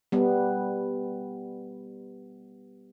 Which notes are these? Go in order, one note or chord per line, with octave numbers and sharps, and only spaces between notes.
G3 B3